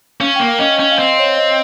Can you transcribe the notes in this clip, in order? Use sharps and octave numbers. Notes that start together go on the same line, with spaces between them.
C#4 F5
A#3 G5
F5
C#4 D#5
C#4
F5
C4 D#5
C#5
D#5